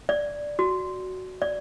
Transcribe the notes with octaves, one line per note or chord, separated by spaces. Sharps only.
D5
F#4
D5